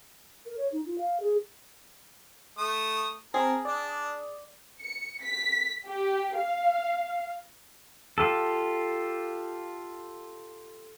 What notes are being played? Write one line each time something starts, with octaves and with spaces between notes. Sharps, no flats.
A#4
C#5
D#4
F4
F5
G#4
A3 D#6
C4 G#4 A#4 A5
D4 D5
C#7
B6
G4
F5
F4 G4 A4